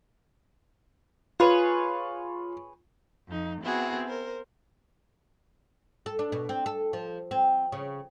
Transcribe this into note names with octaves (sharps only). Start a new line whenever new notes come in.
F4 G#4 B4 C#5
F2 F3 D#4
B3 C4 E4 F#4 G#4
A#4 C5
A4
D4
B2
C4
A4
F3
C4
C#3